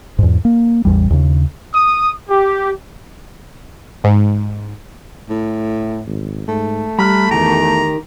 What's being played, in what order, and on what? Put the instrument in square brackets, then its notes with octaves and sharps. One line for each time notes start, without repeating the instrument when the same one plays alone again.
[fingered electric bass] E2 G#2
A#3
A1 E2 G3
D#2 C#3
[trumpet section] D#6
G4
[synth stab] G#2
[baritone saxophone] A2
[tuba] G#1
[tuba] G#2 [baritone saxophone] A3
[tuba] G3 [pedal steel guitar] A#5 F6 F#6 [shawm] B5
[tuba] E2 [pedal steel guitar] D#3 G4 [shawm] A#5